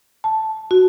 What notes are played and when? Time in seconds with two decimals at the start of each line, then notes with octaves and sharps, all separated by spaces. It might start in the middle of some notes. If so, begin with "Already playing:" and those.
0.24 A5
0.71 F#4